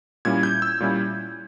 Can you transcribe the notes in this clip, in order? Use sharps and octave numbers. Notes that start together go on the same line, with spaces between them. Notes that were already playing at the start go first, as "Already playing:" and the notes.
A#2 G3 C#4 E4 G#6
G6
E6
A#2 G3 C#4 E4